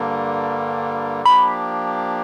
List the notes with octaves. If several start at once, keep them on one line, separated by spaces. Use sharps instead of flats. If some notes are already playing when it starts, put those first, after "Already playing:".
Already playing: G2 D3 G3 A#3
F3 A#3 D4 G4 B5